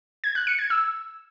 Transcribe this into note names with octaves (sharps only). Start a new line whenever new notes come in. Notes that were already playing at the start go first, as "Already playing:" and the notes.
G#6
F#6
C#7
G#6
E6